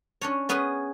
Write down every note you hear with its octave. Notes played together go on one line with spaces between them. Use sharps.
C#4 D4 C#5
B3 C#4 G#4 B4 G#5